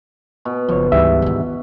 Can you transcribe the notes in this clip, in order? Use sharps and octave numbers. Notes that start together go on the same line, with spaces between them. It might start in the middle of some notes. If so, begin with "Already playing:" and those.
B2
F#1 F3 C#5
D2 G#2 E3 G3 E5
D#3 F4